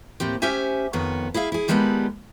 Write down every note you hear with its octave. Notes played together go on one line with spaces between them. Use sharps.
D#2 A2 C4 G4
C#4 G4 C5 E5 G#5
F2 D#3 B3 C#5
E4 G#4 E5 F5
E4 G#4
D#3 G3 G#3 B3 B4 A5